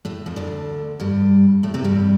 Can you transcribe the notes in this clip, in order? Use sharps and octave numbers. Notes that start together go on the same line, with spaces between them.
A2 A3
F2 F3
D2 D3
G2 G3
A2 A3
C3 C4
G2 G3